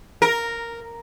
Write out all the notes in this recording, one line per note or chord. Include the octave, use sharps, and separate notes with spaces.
A#4